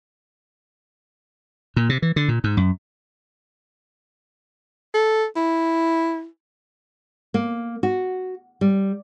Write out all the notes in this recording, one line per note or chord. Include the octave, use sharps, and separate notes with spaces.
A#2
C3
E3
D3
A#2
G#2
F#2
A4
E4
A#3
F#4
G3